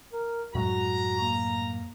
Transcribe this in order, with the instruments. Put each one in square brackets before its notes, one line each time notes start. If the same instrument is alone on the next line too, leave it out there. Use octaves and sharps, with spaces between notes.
[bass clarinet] A#4
[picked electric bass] F#2 A2 G#3 [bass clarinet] F#4 [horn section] A#5
[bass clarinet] A#3